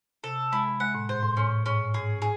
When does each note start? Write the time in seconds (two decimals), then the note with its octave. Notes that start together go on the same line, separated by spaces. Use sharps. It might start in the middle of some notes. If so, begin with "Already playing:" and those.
0.24 C3 A4
0.52 G#3 E4
0.80 G#3 F#5
0.95 A2
1.09 G#2 C5
1.23 A2
1.37 A2 C#4
1.66 G#2 C#4
1.94 G#2 G#4
2.22 G#4